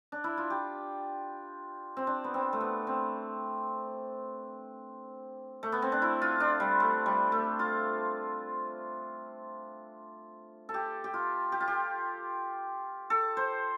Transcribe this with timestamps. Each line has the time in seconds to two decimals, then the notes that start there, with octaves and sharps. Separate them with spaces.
0.12 D4
0.24 E4
0.37 F4
0.50 G4
1.97 C4
2.07 D4
2.24 B3
2.34 C4
2.53 A3
2.61 B3
2.87 C4
5.63 A3
5.72 B3
5.82 C4
5.92 D4
6.02 E4
6.22 F4
6.40 D4
6.60 G3
6.80 A3
7.06 G3
7.32 A3
7.59 F4
10.69 A4
10.74 G4
11.04 G4
11.14 F4
11.52 G4
11.60 F4
11.68 G4
13.10 A4
13.37 C5